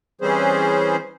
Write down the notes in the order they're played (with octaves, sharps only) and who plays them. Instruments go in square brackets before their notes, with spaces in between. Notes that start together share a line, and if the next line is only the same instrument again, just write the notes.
[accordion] E3 G3 C4 C#4 G#4 C5